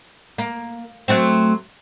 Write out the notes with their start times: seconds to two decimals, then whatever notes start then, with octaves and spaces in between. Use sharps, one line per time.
0.38 A#3
1.08 F#3 A3 C4